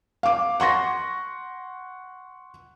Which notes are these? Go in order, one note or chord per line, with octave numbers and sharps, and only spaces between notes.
F5 D6
F#5 C6 C#6 A#6